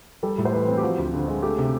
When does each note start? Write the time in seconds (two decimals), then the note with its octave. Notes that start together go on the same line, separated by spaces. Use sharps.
0.23 G3 A4
0.38 A2
0.45 C5
0.53 E3 B4
0.68 C4
0.78 G4
0.82 F3 F#4
0.98 D2
1.13 D3
1.28 G#3
1.42 A3 G4
1.58 C3